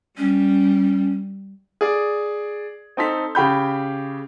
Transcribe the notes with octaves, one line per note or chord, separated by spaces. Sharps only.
G3 C#4
G#4 D5
C4 D#4 A4 B6
C#3 G4 B5 G6